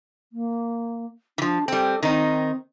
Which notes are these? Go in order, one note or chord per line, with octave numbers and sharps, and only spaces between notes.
A#3
E3 F3 D4
G3 C4 A4
D#3 C4 D#4